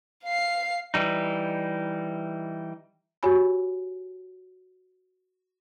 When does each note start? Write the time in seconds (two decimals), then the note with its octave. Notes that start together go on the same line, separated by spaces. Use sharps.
0.24 F5 C7
0.94 E3 G3 D#4
3.23 F#4 G4 C#5 G#5 B5